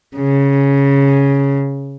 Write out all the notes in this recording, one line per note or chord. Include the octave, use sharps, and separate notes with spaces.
C#3